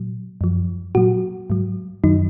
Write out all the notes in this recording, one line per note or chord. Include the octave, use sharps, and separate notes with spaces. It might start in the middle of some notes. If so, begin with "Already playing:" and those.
Already playing: A#2 F#3
F#2 F3
A#2 F#3 F#4
G#2 F#3
F#2 D#3 F#3 D#4